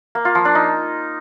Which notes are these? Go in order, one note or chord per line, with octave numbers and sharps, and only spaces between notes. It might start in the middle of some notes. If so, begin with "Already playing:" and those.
A#3
F4
F3
D4
D#4